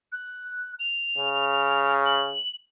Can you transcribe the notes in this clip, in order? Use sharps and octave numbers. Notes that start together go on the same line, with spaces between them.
F#6
F7
C#3
F#7